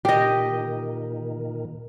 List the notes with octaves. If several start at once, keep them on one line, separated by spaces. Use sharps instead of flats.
A#2 D#3 G4 D#5